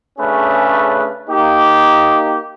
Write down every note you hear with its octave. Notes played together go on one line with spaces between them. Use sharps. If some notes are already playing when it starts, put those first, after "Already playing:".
C#3 A3 C#4 D4 G#4 B4
A#3 D#4 G4